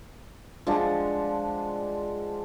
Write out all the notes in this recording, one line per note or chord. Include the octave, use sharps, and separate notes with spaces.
F3 G#3 D4 F#5